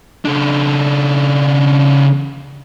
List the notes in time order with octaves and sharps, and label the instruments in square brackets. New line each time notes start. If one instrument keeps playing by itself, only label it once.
[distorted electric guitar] C#3 D4